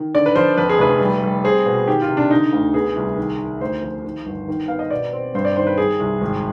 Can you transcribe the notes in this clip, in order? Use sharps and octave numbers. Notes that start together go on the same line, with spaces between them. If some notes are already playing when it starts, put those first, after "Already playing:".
Already playing: D#3
D3 D5
B4
F3 C5
F2 B4
G#4
F1 B4
G3
G3
C4 G#4
B2
D#3 G4
F4
C3
D4
D3 D#4
D2
B3 G#4
C2
D#3
D#3
D2 C5
F3
D#3
G1
D#3
B3 F5
D#5
B2 D5
C4
G2 C5
D5
D#3 C5
B4
G3 G#4
C2
G#1